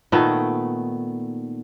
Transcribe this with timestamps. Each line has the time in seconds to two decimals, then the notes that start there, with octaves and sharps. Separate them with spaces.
0.12 A#2 D#3 A3 B3